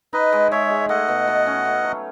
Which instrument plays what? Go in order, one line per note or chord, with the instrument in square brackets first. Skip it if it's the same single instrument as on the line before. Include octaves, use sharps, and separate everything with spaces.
[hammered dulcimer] D#4 [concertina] B4 D#5
[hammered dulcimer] G#3
[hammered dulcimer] G#3 [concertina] C#5 E5
[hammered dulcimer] G#4
[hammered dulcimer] A3 [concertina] D#5 F#5
[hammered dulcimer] B2
B2
C#4
A3
F#3